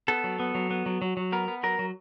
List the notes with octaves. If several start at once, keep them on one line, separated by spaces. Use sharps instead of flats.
B3 A4
F#3
B3
F#3
B3
F#3
F#3
F#3
B3 A#4
B3
F#3 A#4
F#3